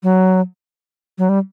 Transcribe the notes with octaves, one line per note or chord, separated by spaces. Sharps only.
F#3
F#3
G3